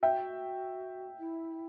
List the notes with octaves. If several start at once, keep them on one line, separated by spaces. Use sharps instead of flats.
F#4 E5 G5
E4